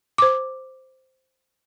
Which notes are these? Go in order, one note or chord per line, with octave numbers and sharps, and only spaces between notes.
C5 D6